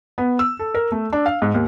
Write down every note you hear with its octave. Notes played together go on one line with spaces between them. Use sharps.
B3
E6
A4
A#4
A3
D4
F5
G#2
D#2